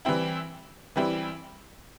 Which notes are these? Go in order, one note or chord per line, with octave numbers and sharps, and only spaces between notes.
E3 G3 C4 E4
E3 G3 C4 E4